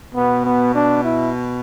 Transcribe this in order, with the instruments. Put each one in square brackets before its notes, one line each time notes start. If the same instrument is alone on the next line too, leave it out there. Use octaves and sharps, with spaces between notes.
[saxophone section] B2 [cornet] B3
[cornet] B3
D4
E4